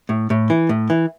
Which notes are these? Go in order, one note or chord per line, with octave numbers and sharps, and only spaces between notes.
A2
A2
E3
A2
E3